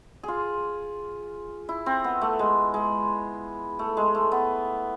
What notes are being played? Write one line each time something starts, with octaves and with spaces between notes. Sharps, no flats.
F4 G#4
E4
C4
B3
A3
G#3
G#3
A3
G#3
A3
B3